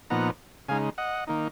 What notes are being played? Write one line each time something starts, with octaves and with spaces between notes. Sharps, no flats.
A#2 F3 B3 D#4 F#5 A#5
C#3 G#3 D#4 F5 G#5
D#5 F#5
D#3 A#3 D#4